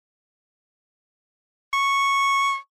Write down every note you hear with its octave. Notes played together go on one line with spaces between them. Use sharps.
C#6